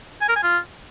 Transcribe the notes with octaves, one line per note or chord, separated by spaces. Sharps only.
G#5
A#4
G#5
F4